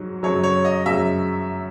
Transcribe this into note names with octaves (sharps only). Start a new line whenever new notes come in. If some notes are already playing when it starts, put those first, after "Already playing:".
Already playing: G#2 F#3
F#2 C#3 F#3 C#5
C#5
D#5
F#2 C#3 F#3 E5